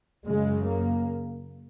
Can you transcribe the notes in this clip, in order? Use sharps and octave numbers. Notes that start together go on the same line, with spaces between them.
F#2 C#3 G#3
A#3